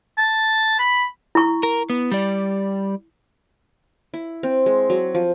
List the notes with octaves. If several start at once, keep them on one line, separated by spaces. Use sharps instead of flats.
A5
B5
E4 C#6
A#4
B3
G3 D5
E4
C4
G#3
F#3
F3